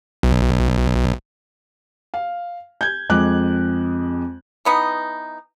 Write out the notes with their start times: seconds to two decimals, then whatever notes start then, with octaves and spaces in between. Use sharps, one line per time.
0.23 B1
2.14 F5
2.81 G6 G#6
3.09 F2 G#3 D6 F#6
4.65 E3 B3 D#4